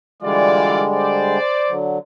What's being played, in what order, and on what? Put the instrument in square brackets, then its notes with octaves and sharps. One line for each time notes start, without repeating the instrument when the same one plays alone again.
[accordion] D3 G3 G#3 [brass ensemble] E3 F4 D5
[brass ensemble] C5 D5
[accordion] D3 F#3